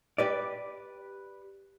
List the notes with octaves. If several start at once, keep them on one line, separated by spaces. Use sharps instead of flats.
G4 B4 D5